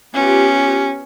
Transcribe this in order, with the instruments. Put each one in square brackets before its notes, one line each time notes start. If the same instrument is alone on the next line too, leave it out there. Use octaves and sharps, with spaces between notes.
[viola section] B3 F4 G4 [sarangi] C#4